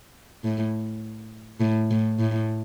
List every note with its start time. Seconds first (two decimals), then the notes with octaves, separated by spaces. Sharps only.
0.44 A2
1.61 A2
1.91 A2
2.19 A2